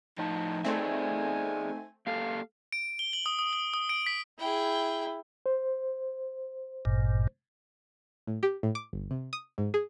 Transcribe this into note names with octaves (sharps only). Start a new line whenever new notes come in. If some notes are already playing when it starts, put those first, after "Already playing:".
A2 F3 D#4 A5
A3 C4 G#4 D5 E5 G#5
A#3 G4 A4 F5
D7
G7
F#7
D#6
D#6
F#7
D#6
D7
B6
E4 G#4 G5
C5
G#1 G2 A#2
A2
G4
A2
D6
G1
C3
D#6
G#2
G#4